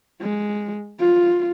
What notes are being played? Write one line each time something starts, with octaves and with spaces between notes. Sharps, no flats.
G#3
F4